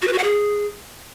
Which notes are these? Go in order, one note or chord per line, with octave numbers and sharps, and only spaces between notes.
F#4
B4
F#4
F#5
G#4